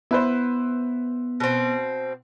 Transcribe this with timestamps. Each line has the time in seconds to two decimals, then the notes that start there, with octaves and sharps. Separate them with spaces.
0.11 B3 E4 B4 C5
1.40 B2 C4